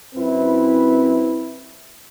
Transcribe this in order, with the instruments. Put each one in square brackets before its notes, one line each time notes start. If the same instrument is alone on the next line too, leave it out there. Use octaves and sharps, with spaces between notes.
[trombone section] F#2 C4 E4 B4